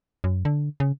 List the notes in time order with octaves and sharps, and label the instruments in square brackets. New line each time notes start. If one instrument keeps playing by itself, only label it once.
[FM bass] F#2
D3
C#3